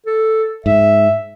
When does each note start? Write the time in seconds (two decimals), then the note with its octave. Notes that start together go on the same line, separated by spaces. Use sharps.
0.06 A4
0.66 G#2 E5